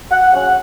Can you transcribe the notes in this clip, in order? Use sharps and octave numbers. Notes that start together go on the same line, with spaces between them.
F#5
C#3 F#3 C#4 F#5